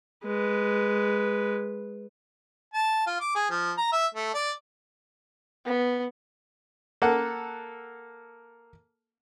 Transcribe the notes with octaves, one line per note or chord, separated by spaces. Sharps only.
G#3 B4
A5
F4
D6
G#4
F3
A#5
E5
A3
D5
B3
A#3 A4 F#5